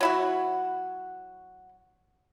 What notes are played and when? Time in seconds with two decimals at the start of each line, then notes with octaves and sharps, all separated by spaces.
0.01 F#3 E4 F#4